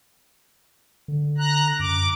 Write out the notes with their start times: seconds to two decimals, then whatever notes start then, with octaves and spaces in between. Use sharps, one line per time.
1.08 D3
1.38 A#5 F#6
1.79 F#2 D6